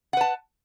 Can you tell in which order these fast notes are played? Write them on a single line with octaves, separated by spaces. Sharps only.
F#5 B4 A5